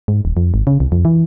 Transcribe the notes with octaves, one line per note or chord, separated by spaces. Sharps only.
G#2
D#1
F2
G#1
C#3
C2
F2
E3